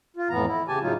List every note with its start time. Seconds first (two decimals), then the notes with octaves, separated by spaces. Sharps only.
0.17 F4
0.30 F2 A2 E3 B3 A#5
0.46 E4
0.68 C#3 G4 G#5 A5
0.82 A2 C#3 F#3 A3 D#4 F4